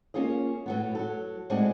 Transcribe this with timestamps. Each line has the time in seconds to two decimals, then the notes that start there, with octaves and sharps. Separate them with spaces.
0.14 A#3 C#4 F4 G#4 D#5
0.66 A2 F#3 B3
0.95 F#3 A4
1.50 A2 G#3 C4 D4 F#4 D5